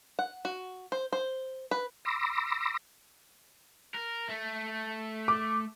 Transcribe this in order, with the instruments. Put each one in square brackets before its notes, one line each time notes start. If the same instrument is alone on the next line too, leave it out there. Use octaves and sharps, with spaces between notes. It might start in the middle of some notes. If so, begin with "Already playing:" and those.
[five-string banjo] F#5
F#4
C5
C5
B4
[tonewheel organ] B5 C6 D6 E6 A#6
[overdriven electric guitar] A#4
A3
[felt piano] D6